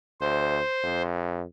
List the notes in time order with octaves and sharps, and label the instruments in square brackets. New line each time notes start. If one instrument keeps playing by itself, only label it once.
[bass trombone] D2 [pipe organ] C5
[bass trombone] F2